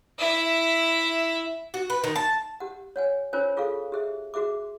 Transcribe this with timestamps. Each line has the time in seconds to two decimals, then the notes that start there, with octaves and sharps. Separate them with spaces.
0.19 E4 E5
1.74 F#4
1.90 B4
2.04 D#3
2.16 A5
2.60 G4 F#5
2.96 C#5 F#5 G#5
3.33 C#4 F4 A#4 C5 C#5 G#5
3.57 F4 G#4 A4 F5
3.92 G4 G#4 E5
4.34 F#4 G#4 E5 D6